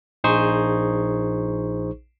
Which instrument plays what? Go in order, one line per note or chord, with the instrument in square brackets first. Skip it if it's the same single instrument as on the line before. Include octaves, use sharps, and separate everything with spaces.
[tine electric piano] A#1 D#4 G#4 C5 C#6